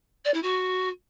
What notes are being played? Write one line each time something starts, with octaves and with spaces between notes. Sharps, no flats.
D5
E4
F#4